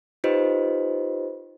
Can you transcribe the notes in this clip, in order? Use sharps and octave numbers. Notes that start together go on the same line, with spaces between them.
D#4 F4 G4 B4 C5 D#5